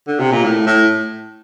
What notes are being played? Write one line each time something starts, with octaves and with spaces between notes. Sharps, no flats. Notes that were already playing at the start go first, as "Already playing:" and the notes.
D3
C3
A#2
A2
A2